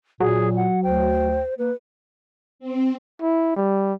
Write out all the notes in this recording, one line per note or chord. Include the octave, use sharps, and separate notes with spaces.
A#2 F#3 G#4
F#5
D2 C5 G5
A#3 B4
C4
E4
G3